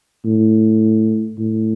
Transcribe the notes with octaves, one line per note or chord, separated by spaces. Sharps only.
A2
A2